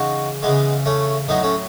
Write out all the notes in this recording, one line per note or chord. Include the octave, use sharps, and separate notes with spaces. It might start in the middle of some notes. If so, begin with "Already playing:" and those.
Already playing: C#3 E3 D#4 F#4
C#3 E3 G#3 B3
A3 C#4
A2 F#3 B3 D#4
A3 C#4